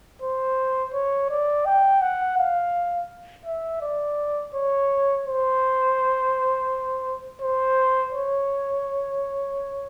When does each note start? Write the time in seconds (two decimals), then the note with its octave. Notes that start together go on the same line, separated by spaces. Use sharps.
0.22 C5
0.93 C#5
1.30 D5
1.66 G5
2.01 F#5
2.38 F5
3.45 E5
3.81 D5
4.54 C#5
5.26 C5
7.42 C5
8.13 C#5